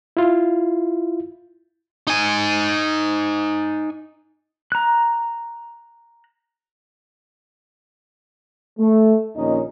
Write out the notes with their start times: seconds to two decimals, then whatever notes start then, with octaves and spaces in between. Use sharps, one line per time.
0.17 E4 F4
2.07 D#4 G#5
4.72 A#5 F#6
8.78 A3
9.36 A#1 D#2 A#2 C#4 D#4 D#5